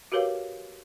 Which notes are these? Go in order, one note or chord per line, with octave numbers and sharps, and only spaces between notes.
F#4 G4 A#4 B4 C#5 F5